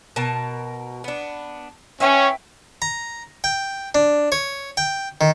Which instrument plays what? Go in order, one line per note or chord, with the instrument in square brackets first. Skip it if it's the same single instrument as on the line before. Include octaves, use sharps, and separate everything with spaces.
[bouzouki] B2 A#4 A5
B3 D4
[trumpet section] C#4 [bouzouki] E4 B4 G5
[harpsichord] A#5
G5
D4
C#5
G5
D#3